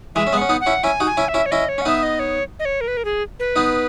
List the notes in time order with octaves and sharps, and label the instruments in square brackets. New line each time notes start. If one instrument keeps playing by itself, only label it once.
[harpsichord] E3 G#3 [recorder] E5
[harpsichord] C#4
G#3 B3
[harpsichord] C#4 [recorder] F#5
[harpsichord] B3 D#4
[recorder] F#5
[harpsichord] C#4 E4
[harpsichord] C#4 E4 [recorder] G#5
[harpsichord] D#4 F#4
[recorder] G#5
[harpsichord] C#4 E4
[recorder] E5
[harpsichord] C#4 E4
[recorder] C#5
[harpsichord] C#4 E4 [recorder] D#5
[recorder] C#5
[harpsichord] C#4
[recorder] F#5
[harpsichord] B3 D#4 [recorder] E5
[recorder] D#5
C#5
D#5
C#5
A#4
B4
A#4
G#4
B4
[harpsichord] B3 D#4